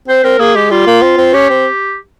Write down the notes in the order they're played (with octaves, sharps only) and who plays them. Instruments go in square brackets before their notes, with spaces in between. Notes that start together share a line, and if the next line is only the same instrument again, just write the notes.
[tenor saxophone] C4 [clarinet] C5
[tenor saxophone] C4 [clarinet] A#4
[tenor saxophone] A#3 [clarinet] G#4
[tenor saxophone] G#3 [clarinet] G4
[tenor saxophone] G3 [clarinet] F4
[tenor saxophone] A#3
C4
C4
[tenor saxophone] C#4 [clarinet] G4
[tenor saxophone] C4